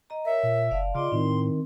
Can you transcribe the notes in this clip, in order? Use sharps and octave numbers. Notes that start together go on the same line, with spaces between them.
D#5 A#5
A#4 C#5 E5
A#2
F#1 D5 F5 A5
C#3 F4 D5 D#5 C6 D6
A2 D#3 C4